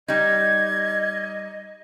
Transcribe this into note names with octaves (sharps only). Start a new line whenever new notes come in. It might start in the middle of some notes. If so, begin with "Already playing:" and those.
G3 D#4 D#5 G#6